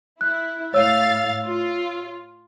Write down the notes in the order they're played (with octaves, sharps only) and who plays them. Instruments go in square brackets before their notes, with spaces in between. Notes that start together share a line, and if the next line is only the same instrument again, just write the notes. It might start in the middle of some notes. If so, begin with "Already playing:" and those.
[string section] E4 [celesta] F#6
[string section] A2 F5 A6 [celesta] C#5 E6
[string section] F4